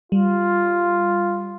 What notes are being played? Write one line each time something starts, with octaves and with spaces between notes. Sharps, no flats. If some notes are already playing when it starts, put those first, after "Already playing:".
G3 F4